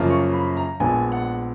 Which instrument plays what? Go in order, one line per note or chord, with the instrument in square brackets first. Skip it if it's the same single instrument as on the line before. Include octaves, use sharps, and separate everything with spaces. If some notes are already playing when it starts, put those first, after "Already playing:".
Already playing: [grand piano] F#2 C#3 F3 A#3 F4
C#6
B5
A#5
A#1 A#2 G#3 B3 G#5
F#5